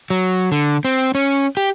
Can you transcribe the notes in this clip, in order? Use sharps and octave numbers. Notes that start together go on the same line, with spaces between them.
F#3
D3
C4
C#4
G4